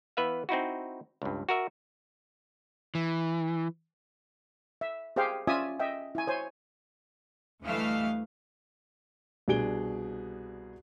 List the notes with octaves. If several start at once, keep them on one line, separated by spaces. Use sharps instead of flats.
E3 B3 B4 E5 F5
C4 D#4 E4 F#4
C#2 G2
F#4 A#4 E5
E3
E5
G4 G#4 C5 F5 G5
C#4 F4 D5 E5 G#5 D#6
D#5 E5 G5
E4 G#5
C5 C#5 G#5
D2 E3 G3 A3 D#5 F5
C2 B2 D4 G#4 D7 G7